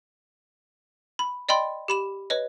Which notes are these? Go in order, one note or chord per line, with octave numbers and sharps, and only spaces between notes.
B5
D5 D#5 G5 B5 C6
G4 B5 E7
B4 C#5 D#5